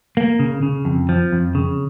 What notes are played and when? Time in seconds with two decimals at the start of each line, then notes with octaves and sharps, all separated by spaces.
0.17 A#3
0.39 C#3
0.63 C#3
0.85 F2
1.09 F3
1.32 F2
1.55 C#3